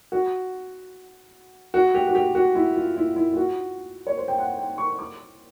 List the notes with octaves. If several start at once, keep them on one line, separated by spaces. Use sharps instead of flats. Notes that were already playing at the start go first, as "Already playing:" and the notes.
F#4
F#4
G4
F#4
G4
F#4
E4
F4
E4
E4
F4
F#4
C#5
C5
G5
F#5
G5
C#6
D6